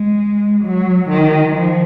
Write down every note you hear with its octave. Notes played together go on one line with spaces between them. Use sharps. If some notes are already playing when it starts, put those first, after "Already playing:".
Already playing: G#3
F#3
D#3
F3